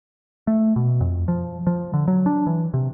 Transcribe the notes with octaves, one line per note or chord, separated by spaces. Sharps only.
A3
B2
F2
F3
F3
D3
F#3
D4
E3
C3